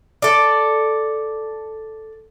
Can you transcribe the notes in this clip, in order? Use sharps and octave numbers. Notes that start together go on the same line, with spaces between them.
A4 D5